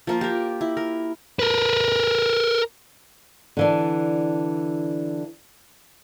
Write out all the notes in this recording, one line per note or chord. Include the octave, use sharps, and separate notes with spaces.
F3 A#3 F4
G4 A#4
E4
A#4
A#4 B4
D3 E3 D4